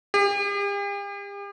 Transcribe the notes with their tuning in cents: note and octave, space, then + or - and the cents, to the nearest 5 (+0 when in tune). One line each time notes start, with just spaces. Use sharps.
G4 +45